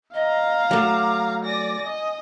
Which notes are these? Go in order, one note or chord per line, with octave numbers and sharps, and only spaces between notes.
D#5 F5 A#5
F#3 A3 D6
D5 G#5 A#6
D#5